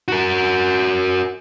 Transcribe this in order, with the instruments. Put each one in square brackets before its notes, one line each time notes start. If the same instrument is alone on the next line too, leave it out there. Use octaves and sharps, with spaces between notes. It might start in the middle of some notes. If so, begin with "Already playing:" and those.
[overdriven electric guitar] F#4 A#4